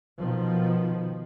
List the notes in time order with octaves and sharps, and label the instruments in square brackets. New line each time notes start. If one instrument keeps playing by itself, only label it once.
[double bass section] B2 D#3 F3